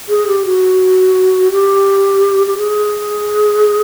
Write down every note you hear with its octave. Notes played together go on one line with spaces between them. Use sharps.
G#4
G4
F#4
G4
G4
G#4